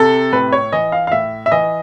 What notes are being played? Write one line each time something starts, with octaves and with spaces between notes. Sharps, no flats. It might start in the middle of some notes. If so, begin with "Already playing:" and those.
Already playing: C3 A4
A2 B4
C#5
E3 D#5
F5
F5
A2 E5
E5
E3 D#5